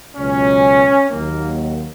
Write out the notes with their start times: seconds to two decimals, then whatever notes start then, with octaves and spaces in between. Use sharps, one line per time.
0.17 C#2 B2 F#3 C#4
1.09 D#2 D#3 F#3 A#3